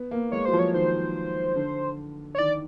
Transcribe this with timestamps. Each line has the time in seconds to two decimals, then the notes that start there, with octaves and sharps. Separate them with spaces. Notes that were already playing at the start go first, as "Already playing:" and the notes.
Already playing: B3
0.11 A#3
0.32 G#3 C#5
0.45 F#3 C5
0.53 F3
0.59 C#5
0.74 D#3 C5
1.56 D3
2.35 C#5
2.38 D#3 D5